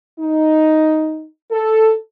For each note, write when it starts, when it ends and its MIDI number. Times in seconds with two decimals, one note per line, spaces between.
0.18 1.25 63
1.51 1.93 69